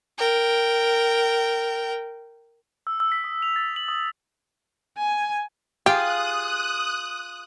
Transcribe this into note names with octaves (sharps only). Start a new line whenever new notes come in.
A#4 G5
E6
E6
B6
D#6
F7
A6
F#7
D#6
G#5
F4 G4 G#4 D#6 F#6